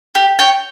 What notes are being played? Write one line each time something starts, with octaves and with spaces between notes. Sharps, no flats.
G4
C#5 G5